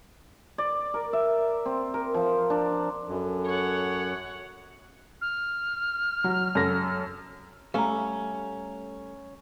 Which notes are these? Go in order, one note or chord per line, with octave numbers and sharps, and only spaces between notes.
D5
A#4
E5
C4
A#4
F3
D4
F#2 A4
C#5 F#5
F6
F#3
F#2 A4 A#6
G3 A3 C#4 F5 A#5